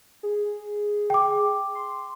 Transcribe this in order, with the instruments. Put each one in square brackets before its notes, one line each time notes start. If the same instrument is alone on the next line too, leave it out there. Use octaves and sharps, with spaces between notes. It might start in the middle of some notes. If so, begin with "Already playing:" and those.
[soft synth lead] G#4
[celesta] G5 D6
[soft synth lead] C6